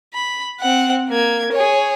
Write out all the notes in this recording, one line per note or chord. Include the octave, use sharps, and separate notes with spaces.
B5
C4 F#5
A#3 G#6
G#4 C#5